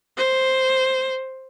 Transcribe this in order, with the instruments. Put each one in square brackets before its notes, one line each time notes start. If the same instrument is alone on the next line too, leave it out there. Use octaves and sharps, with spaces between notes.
[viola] C5